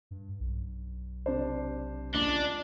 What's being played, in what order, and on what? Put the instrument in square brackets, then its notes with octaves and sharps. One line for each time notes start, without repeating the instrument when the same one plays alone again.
[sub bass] G2
B1
[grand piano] C3 D4 C5
[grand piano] C#2 [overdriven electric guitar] D4